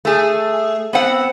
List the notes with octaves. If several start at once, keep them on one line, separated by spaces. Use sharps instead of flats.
A3 G#4
B3 C4 F#5